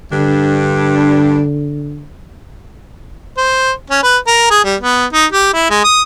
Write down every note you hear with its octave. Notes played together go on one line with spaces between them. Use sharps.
G2 D3 D4
C5
C#4
B4
A#4
G#4
G3
B3
D#4
G4
E4
G#3
D#6